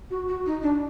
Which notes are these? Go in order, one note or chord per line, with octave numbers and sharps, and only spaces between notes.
F#4
F#4
D#4
D4